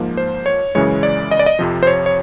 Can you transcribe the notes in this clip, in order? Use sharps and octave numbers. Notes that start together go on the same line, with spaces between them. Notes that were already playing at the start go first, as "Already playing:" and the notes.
Already playing: G#2 F3 A#3
C5
C#5
F#2 C#3 E3 G#3 C#5
D5
D#5
D5
D#5
F2 C3 F3
C5
C#5
C#5